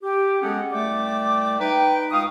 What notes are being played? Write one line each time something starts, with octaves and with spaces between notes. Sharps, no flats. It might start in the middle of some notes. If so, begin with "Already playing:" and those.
G4
G#3 B3 C#4 G#4 A4 F#5
C2 A3 D5 G5 D6
D#4 B4 G5
C#2 F5 C#6 D#6